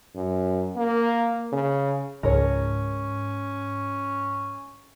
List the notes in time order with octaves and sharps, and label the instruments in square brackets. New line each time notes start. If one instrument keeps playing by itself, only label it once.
[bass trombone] F#2
A#3
C#3
[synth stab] C#2 [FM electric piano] G#2 [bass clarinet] C#4 [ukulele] A#4 C#5